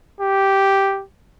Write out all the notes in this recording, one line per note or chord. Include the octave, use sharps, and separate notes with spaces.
G4